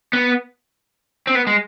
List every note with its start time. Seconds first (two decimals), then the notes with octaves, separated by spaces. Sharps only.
0.13 B3
1.27 C4
1.35 B3
1.47 G#3